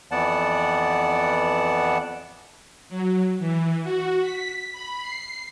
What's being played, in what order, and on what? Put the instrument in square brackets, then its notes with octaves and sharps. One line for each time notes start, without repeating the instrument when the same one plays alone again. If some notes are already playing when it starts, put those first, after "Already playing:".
[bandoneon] F2 E3 B3 D5 F#5 A5
[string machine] F#3
E3
F#4
B6
B5
C7